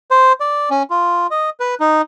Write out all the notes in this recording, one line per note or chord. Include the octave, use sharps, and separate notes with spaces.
C5
D5
C#4
F4
D#5
B4
D#4